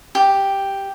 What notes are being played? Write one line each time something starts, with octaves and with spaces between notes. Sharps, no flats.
G4